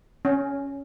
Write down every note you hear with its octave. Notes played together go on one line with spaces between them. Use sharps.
C#4